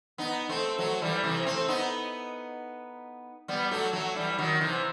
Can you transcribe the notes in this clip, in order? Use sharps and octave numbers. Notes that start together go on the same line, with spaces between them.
B3 D#4
A3 C4
F#3 A3
E3 G3
C3 E3
A3 C4
B3 D#4
G3 B3
F#3 A3
F#3 A3
E3 G3
D#3 F#3
C3 E3